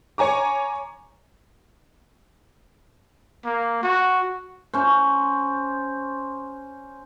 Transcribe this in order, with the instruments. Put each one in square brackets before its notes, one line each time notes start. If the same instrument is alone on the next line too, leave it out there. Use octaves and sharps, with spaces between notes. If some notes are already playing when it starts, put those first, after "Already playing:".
[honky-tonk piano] C#5 G#5 A#5 D6
[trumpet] A#3
F#4
[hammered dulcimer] C#4 C5